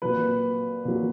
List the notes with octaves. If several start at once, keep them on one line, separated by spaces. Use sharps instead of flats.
A#2 F#3 B4
A#2 F#3